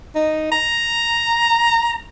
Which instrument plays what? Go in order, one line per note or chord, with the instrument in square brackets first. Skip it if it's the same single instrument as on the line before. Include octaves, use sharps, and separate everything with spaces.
[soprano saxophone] D#4
A#5